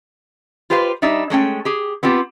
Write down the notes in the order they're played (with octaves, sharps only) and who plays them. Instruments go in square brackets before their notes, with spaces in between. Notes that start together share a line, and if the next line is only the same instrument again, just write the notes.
[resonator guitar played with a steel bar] F4 G4 B4 C5 F5
G3 D4 D#4 E5
G#3 A3 C#4 G5
G4 G#4
B3 C4 F4 G4